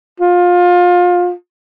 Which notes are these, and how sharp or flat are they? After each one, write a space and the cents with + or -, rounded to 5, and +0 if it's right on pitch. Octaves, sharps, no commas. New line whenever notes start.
F4 +25